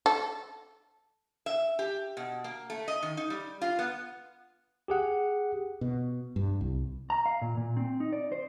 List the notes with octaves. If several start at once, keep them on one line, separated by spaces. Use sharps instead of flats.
A4
E5
G4
B2
A#3
A3
D#5
D#3
D#4
G3
F4
B3
G4 G#4 F#5
B2
G2
C2
A#5
F5
A#2
A#2
C4
D#4
D5
C5